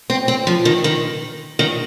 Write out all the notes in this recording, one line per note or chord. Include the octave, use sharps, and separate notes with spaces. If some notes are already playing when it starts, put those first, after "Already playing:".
C4
C4
F3
D#3
D#3
D#3